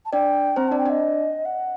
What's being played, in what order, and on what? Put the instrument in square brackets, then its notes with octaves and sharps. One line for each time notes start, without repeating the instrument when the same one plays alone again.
[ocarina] A5
[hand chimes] D4 D5 [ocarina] G5
[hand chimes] C4 C5 [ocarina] A#5
[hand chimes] D4 D5 [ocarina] A5
[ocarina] G5
[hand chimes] D4 D5 [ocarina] D#5
[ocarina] F#5